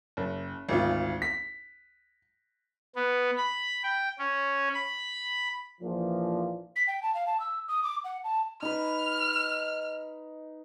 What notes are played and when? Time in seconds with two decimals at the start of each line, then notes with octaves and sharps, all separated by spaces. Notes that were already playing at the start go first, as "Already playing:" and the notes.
0.17 F#1
0.69 G#1 D2 F4
1.22 B6
2.96 B3
3.37 B5
3.84 G5
4.19 C#4
4.74 B5
5.81 A#1 A#2 E3 F3
6.76 B6
6.87 G5
7.02 A5
7.14 F5
7.26 A5
7.40 E6
7.68 D#6
7.83 D6
8.04 F#5
8.24 A5
8.62 D#4 B4 F6